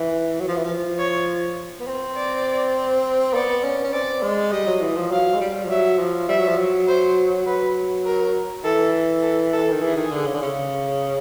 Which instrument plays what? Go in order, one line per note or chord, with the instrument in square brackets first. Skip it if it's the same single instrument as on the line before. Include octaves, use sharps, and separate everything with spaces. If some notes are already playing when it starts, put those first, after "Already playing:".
Already playing: [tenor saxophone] E3
F#3
F3
E3
F3
[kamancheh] C#5
[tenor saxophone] B3
C4
[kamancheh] D5
[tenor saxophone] B3 [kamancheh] D5
[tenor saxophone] C#4
C#4
[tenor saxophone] C4 [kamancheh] D5
[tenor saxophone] G#3
[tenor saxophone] G3 [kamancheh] D#5
[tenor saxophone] F#3
E3
F3
[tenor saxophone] F#3 [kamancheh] F5
[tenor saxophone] G#3
G3
F3
[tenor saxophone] F#3 [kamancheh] E5
[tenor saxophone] F3
[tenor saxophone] G3 [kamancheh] E5
[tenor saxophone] F#3
F3
F#3
[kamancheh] C5
[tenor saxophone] F#3 [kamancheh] B4
[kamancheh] A#4
[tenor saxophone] E3 [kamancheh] A4
[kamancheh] A4
A4
[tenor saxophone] D#3
[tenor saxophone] E3 [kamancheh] G#4
[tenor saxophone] D#3
D3
C#3
D3
C#3